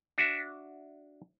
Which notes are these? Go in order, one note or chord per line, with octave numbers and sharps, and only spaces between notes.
D4 F#4 E5